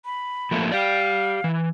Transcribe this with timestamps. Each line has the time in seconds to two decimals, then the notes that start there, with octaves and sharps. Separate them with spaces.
0.05 B5
0.51 F3 A3 A#3
0.72 G4 D5 F5
1.44 E3